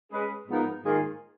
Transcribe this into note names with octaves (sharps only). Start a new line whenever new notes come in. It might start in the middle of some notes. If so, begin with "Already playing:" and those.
G#3 C#4 G#4 B4
G#2 F3 B3 D#4 A#4
G#2 D#3 A#3 F4 G#4